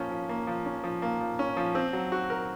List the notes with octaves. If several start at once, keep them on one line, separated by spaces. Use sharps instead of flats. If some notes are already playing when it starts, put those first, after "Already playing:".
Already playing: F3 A#3 C#4
F3
A#3
F3
C#4
F3
A#3
F3
C#4
F3
C4
F#3
F#4
A#4